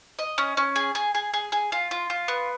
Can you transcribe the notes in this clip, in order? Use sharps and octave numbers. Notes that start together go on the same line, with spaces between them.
D#5
C#4
C#4
G#4
G#4
G#4
G#4
G#4
F4
F4
F4
B3